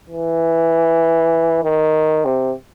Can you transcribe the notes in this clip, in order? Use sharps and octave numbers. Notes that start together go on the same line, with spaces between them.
E3
D#3
C3